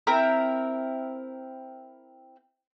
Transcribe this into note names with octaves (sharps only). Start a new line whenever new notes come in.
C4 E4 A#4